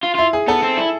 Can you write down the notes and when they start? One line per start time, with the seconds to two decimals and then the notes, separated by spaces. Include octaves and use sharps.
0.04 F4
0.15 E4 F4
0.33 G#4
0.48 B3 A4
0.63 C4
0.77 E4